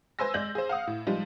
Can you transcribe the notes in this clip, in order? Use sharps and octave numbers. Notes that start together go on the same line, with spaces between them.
B4 C5 G#5 C6 E6 A#6
G#3 D5 G6 A#6 F#7
G#4 C5
F5 F#5 D#6
A2
F3 G3 G#3 D#4